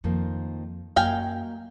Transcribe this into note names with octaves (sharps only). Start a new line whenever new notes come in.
F2 D#3 F3 A#3
F#2 A#3 F#4 D#5 F5 G5 G#5